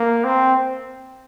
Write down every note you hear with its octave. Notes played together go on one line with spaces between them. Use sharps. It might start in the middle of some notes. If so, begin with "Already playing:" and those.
Already playing: A#3
C4